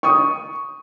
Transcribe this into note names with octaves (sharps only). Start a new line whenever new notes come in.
C#6 D#6